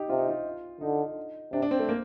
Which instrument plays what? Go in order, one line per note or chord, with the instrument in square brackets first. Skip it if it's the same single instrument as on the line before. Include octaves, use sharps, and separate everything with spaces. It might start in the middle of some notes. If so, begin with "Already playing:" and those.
Already playing: [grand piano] D#4 G4
[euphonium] C3 [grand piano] F4
[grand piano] D#4
F4
[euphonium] D3 [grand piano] D#4
[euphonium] C3 [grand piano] D4
[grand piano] D4
C4
A3
A#3